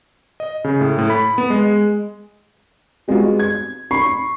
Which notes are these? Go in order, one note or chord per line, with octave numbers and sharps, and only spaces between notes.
D#5
C#3
A2
A2
B5
B3
G#3
G3 G#3 B3 C4 F4 F#4
G#6
B5 C#6 C7